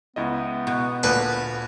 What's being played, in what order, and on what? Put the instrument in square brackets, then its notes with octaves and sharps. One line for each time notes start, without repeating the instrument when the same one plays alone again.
[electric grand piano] C#2 E4 D#5 [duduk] B3
[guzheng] B2
[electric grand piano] D2 A5 [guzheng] A#2 [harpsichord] B4